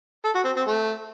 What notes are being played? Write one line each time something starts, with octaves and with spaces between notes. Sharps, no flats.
A4
F#4
C4
C4
A3